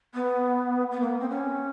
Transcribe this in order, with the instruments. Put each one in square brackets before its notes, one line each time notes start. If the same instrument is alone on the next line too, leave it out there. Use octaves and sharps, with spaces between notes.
[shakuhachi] B3
B3
A#3
B3
C4
C#4